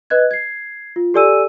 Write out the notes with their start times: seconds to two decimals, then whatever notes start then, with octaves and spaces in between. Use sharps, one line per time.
0.10 B4 D#5 F#6 G#6
0.31 G#6 C7
0.96 F4
1.14 G4 A4 D5 G#5 E6 D#7